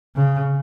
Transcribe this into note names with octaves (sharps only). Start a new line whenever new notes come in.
C#3